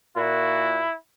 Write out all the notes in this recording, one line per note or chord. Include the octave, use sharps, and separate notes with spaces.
A#2 E4 F#4